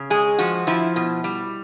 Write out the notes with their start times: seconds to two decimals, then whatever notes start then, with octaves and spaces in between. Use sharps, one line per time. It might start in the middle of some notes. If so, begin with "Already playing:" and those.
Already playing: C#3
0.10 G#3 G#4
0.38 F3 F#4
0.67 F3 E4
0.96 B2
1.24 G3